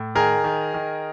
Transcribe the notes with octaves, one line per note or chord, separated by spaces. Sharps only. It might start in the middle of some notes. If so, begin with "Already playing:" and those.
Already playing: A2
D#3 G#4 A#4
D#3
D#3